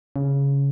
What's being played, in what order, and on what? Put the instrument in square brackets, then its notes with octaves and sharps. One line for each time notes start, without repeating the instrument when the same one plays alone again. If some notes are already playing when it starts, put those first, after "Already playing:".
[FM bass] C#3